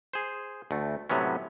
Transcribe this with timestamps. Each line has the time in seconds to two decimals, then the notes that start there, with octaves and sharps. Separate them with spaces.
0.13 G#4 C5
0.71 D2 A3
1.10 A2 C3 F#3 B3 C#4